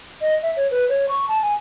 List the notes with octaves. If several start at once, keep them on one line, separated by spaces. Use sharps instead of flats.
D#5
E5
C#5
B4
C#5
C#6
A5
G#5